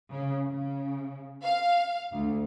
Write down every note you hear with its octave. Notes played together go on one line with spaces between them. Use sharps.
C#3
C#3
F5
D2